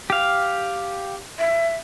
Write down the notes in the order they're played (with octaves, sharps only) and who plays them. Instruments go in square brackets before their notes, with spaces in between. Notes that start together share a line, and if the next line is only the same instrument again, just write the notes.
[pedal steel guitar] G4 F5
[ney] E5